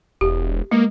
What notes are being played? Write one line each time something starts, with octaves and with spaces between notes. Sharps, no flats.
E1 G4
G#3 A#3